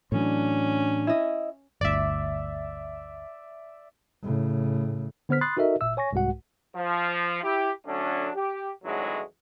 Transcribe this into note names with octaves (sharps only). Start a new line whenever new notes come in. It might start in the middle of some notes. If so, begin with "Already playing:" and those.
A2 E3 F#3 C#4 D4
E4 D#5
G1 D2 D5 E5
A2 C#3
D3 B3 C5 F6 B6
B5 C6 D#6 F#6 A6 C7
D#4 F#4 A4 A#4 D#5 E5
G1 A#2 E5 E6
C#5 G#5 C#6 A#6
C2 G#2 G#3 F#4 F#5
F3
E4 G4
D3 F#3 A3 C#4 D4
G4
G#1 E2 A2 D3 F#3 G#3